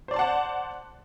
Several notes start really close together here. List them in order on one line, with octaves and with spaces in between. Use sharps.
C5 D5 C6 A5 F#5